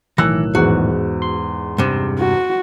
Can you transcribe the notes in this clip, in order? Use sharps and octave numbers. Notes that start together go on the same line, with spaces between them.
B1 A2 D#3 E3 A#5 E6 F#6
E2 G#2 F#4
C6
G2 C3
F#4